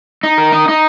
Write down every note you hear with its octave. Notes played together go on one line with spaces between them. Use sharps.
D#4
A#4
D#4
D#4